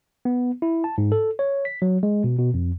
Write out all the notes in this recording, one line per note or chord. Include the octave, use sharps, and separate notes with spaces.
B3
E4
A5
G#2
A4
C#5
B6
F#3
G#3
B2
B2
F2